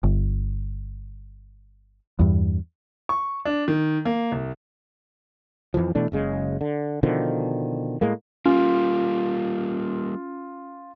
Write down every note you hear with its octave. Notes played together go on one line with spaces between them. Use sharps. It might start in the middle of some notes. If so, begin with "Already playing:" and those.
G1
E2 G2
C#6
D4
D#3
A#3
C2
F2 C#3 E3 F3
B2 E3 A3 D4
F#1 C#3 G#3
D3
B2 D3 D#3 F3
A2 G#3 A#3
G3 A#3 C#4 F4